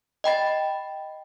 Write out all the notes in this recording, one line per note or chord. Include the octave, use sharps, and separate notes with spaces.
D#5 G5 B5 A6